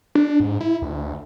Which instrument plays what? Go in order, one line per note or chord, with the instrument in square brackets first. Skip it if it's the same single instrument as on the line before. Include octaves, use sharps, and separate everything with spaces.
[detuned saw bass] D4
G#2
E4
D2